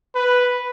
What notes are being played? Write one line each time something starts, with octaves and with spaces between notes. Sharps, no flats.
B4